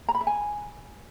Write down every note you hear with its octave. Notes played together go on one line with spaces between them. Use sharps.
A#5
B5
E5
G#5